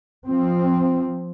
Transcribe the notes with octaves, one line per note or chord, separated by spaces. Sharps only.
F3 C4